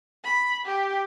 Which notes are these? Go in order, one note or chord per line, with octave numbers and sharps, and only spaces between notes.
B5
G4